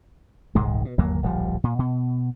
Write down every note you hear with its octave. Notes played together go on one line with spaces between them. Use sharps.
D#1 C2 G#2 G#3
B2
G1 D#2 F#3 A#3
D1 A#1 F3 G3
A#2
B2